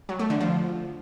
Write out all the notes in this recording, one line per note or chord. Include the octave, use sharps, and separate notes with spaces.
F#3
A3
D3
F3